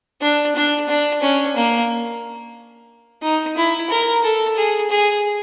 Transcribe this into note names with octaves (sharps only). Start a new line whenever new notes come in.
D4
D4
D4
C#4
A#3
D#4
E4
A#4
A4
G#4
G#4